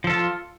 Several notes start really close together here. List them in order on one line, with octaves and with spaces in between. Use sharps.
F3 A4 F4